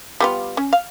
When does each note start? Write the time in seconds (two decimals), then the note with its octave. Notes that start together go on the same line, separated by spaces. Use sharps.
0.20 G3 B3 F4
0.57 C#4
0.73 F5